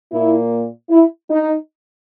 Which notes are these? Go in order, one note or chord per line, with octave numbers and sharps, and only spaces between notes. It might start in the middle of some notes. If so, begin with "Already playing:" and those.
A#2 A#3 E4
E4
D#4